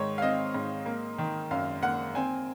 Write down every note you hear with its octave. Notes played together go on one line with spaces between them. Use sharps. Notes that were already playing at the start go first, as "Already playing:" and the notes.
Already playing: G#2 D#3 C#5
F5
C4 D#5
G#2
A#3
D#3
F#2 F5
A#3 F#5
C4 G#5